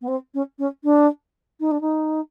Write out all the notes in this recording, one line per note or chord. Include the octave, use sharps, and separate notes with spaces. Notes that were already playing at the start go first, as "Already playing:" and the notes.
B3
C4
C#4
C#4
D4
D#4
D4
D#4